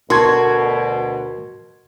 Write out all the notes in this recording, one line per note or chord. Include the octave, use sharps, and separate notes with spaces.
D2 B2 F#4 A#4 A5 C6 C#6 G#6